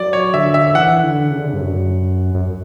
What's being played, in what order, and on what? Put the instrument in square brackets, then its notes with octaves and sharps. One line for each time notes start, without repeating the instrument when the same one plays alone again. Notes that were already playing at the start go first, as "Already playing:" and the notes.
Already playing: [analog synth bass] F#3 [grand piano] D5
[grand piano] C#5
[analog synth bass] D3 [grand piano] E5
[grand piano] E5
[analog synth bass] E3 [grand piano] F#5
[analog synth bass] D3
C#3
D3
C#3
G2
F#2
F#2